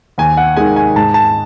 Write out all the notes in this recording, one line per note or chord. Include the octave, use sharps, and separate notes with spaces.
D#2 G#5
F#5
D#3 G#3 G#5
G#5
G#2 A5
A5